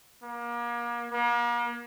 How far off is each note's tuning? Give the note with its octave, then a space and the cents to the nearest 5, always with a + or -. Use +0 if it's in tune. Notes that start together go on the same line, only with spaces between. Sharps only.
A#3 +35
A#3 +40